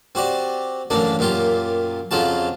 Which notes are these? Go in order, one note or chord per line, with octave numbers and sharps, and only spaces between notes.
C4 F#4 G4 D5
A1 F#2 A#3 D4
F#2 A#2 F4 G4
F2 C#3 F#3 F4 A5